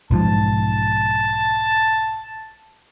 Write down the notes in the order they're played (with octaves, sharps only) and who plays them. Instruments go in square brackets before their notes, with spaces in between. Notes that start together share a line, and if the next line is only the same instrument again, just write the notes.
[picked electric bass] B1 G#2 F3 [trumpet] A5